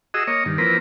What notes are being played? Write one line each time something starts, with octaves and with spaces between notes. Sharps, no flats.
F#4 G#4 D#5 E6
A#3 C#5 D#5
G2 D#3
E3 F3 A#3 C4 A#4 B4